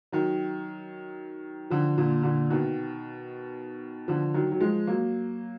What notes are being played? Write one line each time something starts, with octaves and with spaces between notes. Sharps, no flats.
D#3 F#3
D3 F3
A#2 D3
A#2 D3
B2 D#3
D3 F3
D#3 F#3
F#3
F3 G#3
F#3 A#3